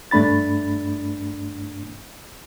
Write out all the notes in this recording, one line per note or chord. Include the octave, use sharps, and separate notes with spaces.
G2 A3 D4 B5 A6